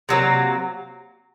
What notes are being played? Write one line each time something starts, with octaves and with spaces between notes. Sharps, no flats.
C3 F#3 A#3